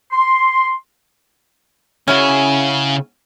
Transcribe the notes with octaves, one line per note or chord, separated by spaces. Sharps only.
C6
C#3 C#4 E4 F#4 G#5